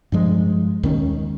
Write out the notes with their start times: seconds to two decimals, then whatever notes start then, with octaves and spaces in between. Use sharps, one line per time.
0.12 G2 F3 G#3
0.83 D#2 D#3 G#3 C#4